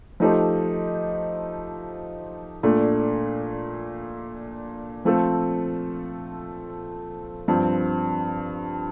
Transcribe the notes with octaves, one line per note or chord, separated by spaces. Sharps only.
F3 A3 D#4 G4 C5
A#2 A3 D4
F3 A3 C4 F4 A4
G2 F3 C4